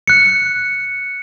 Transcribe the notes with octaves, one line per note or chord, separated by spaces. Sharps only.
F#6 C#7